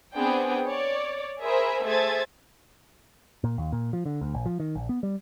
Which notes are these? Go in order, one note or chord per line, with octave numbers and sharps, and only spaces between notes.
B3 C4 D4 G#4 G5
C#5 D5
G#4 A#4 C5 E5 G#5 B5
A3 G#4 C5 E5 G#6 A6
A#2
D#2
A#2
F3
D3
D2
A#1
F3
D#3
A#1
B3
G3